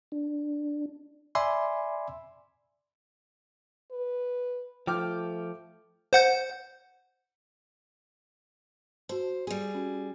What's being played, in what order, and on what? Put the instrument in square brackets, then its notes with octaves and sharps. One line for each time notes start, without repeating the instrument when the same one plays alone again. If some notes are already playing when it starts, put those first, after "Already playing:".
[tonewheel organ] D4
[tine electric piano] D5 E5 G#5 B5 C6 D6
[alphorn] B4
[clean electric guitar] F3 [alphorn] A3 [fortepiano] G5 D6 F6
[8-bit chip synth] C5 F#5 G6
[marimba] F#4 A5 [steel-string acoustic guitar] C5
[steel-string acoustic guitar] G3 G#4
[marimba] C#4 F#4